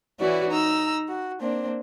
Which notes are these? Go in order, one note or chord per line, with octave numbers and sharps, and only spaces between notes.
E3 C#4 E4 F#4 B4 D5
D#4 A#5 E6
F#4
A#3 C4 D4